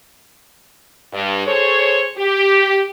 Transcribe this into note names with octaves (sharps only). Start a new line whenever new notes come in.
G2
G#4 A4 C5 C#5
G4